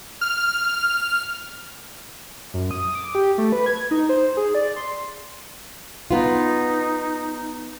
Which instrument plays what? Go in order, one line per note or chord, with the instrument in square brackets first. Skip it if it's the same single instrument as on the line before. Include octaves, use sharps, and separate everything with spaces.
[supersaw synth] F6
[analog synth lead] F#2
D#6
D6
G4
A3
B4
G#6
D#4
C5
G#4
D5
C6
[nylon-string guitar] B3 F4 [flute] D#4